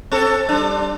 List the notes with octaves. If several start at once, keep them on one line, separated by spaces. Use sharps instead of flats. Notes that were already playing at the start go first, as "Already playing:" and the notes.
C4 A4
G3 D4